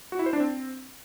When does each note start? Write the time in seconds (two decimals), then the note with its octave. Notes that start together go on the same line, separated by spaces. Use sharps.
0.12 F#4
0.19 E4
0.26 C5
0.33 D4
0.40 C4